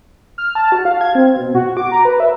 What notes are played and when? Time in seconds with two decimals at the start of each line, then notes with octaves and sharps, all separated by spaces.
0.38 F6
0.55 A5
0.72 F#4
0.85 F5
1.01 G#6
1.15 C4
1.36 B2
1.55 F#4
1.77 D6
1.92 A#5
2.05 B4
2.20 E5